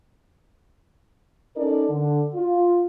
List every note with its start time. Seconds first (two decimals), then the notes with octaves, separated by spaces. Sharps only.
1.56 C#4 D#4 A4 A#4 D5
1.89 D3
2.34 F4